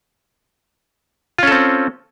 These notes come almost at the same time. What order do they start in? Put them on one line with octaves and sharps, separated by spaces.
F4 C#4 A4 C4